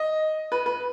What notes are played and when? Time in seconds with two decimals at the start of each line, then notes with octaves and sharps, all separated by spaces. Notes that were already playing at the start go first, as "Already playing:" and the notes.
Already playing: D#5
0.52 B4
0.66 B4